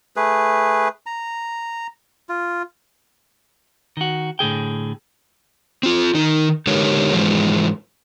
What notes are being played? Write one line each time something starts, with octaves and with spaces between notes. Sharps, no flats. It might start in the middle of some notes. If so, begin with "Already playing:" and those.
A3 G#4 B4
A#5
F4
D#3 F#4
A2 D3 G#4 G5
C4 F4
D#3 D#4
D3 G#3 D#4 G4 A#4 C#5
G#2 E3 F3 G#3